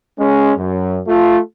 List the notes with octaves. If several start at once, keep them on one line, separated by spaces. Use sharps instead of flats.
G#3 C#4
F#2
A3 F4